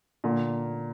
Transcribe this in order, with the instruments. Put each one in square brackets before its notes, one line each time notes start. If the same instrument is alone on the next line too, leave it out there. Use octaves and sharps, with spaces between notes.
[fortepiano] A#2 D3